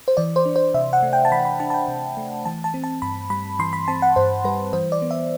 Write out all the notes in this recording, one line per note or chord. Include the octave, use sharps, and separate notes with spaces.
C5
E3 D5
C5
D4
C5
C3 E5
F#5
A3
G5
A5
E3 B5
B5
D4 A5
A5
G5
C3
A3
E3 A5
A5
C4
A5
G2 B5
G3 B5
E3 C6
B5
C4 A5
F#5
G2 C5
G3 B4
E3 C5
D5
B3
E5